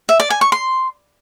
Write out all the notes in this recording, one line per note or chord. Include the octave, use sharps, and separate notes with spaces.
E5
D5
G#5
C#6
C6